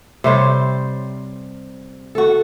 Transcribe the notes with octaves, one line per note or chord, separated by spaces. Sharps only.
C3 G3 C5 C#5
F#4 A4